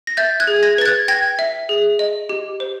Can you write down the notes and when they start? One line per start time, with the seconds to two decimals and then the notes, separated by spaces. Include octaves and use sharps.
0.07 A#6
0.17 E5 G6 A6
0.40 F#6 G#6
0.47 G#4
0.63 G#6 A#6
0.78 B4 A6
0.85 F#6 G#6
1.08 G5 G#6 A#6
1.39 E5
1.69 G#4
1.99 D#5
2.29 G4
2.60 C5